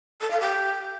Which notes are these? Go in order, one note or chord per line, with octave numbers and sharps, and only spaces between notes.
A4
F5
G4